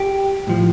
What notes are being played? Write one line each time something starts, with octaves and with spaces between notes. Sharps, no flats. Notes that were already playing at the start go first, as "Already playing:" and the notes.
Already playing: G4
A2 F3